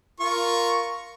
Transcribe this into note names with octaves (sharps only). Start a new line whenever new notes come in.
F4 A#4 C#6